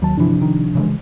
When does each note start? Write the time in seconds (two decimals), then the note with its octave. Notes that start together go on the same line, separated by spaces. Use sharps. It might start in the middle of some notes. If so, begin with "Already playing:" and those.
0.02 D#2 F#3 A5
0.17 G1 C3 E3 F3 D4
0.42 D#3
0.75 C#3 E3 G#3